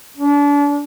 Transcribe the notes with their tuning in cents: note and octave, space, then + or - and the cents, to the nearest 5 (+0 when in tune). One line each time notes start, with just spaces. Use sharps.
D4 -35